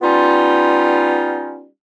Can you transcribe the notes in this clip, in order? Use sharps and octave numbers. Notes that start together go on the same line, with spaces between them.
G3 B3 C#4 D#4 F4